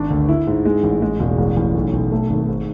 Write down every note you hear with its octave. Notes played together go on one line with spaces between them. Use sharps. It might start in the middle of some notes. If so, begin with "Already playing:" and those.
Already playing: G#1 D4
D2
E4
G#2
G#3
A1
G#3
E1
A1
A1
B1
B1
A3
G#1
G#2